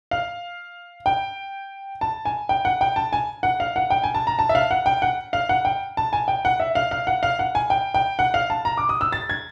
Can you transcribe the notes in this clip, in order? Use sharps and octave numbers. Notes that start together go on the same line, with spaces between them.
F5
G5
A5
G#5
G5
F#5
G5
A5
G#5
F#5
F5
F#5
G5
G#5
A5
A#5
A5
E5
F5
F#5
G5
F#5
F5
F#5
G5
A5
G#5
G5
F#5
E5
F5
F5
F#5
F5
F#5
G#5
G5
G5
F#5
F5
A5
A#5
D6
D#6
E6
A6
G#6